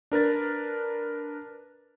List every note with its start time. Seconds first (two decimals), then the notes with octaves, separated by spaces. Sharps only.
0.12 D4 A#4 B4 A6